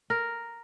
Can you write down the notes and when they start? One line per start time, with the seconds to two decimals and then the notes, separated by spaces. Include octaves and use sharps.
0.10 A#4